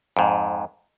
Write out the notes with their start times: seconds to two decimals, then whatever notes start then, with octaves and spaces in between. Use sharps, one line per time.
0.17 F2 G#2